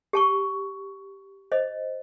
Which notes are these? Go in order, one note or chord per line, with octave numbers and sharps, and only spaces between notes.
G4 A5 C#6
C5 D#5